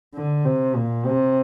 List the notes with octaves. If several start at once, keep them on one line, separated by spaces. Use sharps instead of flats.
D3
C3
A#2
C3